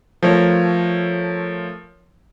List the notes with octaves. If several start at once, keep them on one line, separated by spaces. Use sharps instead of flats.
F3 A3 A#4 C#5